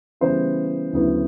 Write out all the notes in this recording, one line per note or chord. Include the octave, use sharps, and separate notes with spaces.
C#3 E3 G3 B3 C5
D2 C#3 F#3 B3 E4